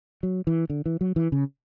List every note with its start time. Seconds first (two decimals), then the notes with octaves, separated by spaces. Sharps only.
0.23 F#3
0.47 E3
0.70 D3
0.86 E3
1.01 F#3
1.16 E3
1.32 C#3